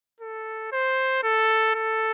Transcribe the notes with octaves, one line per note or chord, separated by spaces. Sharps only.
A4
C5
A4
A4